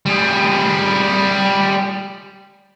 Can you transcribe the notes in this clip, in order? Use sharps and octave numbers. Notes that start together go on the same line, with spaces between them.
G3 G#4